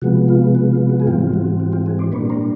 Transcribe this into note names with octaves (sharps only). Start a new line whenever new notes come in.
C3 F3 G#3 B3 F#4
F4
F#4
F4
F#4
G#4
G#2 E3 G3 C4 F4 G4
F4
F#4
F#4
F4 G4
F#4 G#4
C5 D5
A#2 G3 A#3 D4 B4 C#5
A#4 C5